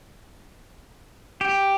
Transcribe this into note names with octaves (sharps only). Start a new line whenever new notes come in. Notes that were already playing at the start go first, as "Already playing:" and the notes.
G4